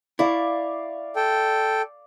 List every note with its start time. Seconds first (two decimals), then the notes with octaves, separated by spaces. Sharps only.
0.19 E4 D5 F5 C#6
1.16 A4 G5